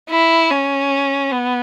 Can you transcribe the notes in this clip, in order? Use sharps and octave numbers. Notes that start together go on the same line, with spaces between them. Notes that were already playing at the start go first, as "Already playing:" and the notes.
E4
C#4
B3